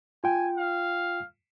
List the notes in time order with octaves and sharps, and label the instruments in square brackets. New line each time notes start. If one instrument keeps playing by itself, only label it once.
[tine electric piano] F4 G5 [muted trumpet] G#5
[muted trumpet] F5